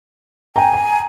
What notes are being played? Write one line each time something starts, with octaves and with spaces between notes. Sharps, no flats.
G5 G#5 A#5
A#5